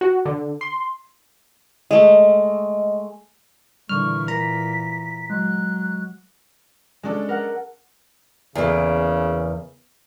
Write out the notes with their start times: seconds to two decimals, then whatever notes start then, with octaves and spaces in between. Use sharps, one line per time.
0.01 F#4
0.26 D3
0.61 C6
1.91 G#3 A3 D#5
3.89 A#2 D3 E3 G3 C#6 F6
4.28 A#4 A#5 B6
5.30 F#3 G#3 F#6
7.03 G#3 C#4 D4 A4
7.29 A#4 F#5
8.55 E2 C#3 A#3